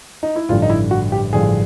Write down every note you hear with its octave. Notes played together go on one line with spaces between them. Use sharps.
D#4
E4
A1 G2 D3 F3 F4
D#4
E4
F#4
G4
A1 G2 D3 F3 G#4